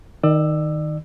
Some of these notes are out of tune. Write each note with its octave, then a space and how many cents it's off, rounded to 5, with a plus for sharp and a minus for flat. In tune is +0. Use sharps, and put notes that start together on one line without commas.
D#3 +0 D5 +35 E6 +0